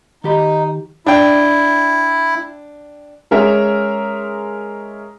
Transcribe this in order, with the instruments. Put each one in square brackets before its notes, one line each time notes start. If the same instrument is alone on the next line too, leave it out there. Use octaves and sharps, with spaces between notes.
[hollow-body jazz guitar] D#3 G4 B5 [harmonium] D#4
[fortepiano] D4 G5 [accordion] E4
[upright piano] G#3 C#4 A#4 E5